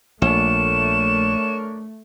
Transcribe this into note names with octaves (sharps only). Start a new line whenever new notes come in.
A#1 A3 D4 A#4 C#5 E7